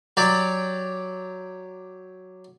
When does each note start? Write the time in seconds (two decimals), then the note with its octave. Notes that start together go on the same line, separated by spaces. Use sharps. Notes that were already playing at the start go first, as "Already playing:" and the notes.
0.17 F#3 G4 D5